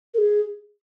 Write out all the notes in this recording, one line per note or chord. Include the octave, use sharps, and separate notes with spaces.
A#4
G#4